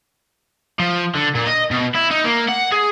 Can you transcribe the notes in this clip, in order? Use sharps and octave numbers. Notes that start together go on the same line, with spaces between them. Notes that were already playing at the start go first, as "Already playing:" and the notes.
F3
D3
A#2
D#5
B2
E4
D#4
A#3
F#5
G#4